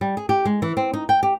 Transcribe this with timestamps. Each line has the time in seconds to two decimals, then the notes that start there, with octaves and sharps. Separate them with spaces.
0.01 G3
0.17 G#4
0.29 G4
0.45 G#3
0.62 E3
0.77 C4
0.93 D#4
1.09 G5
1.23 G4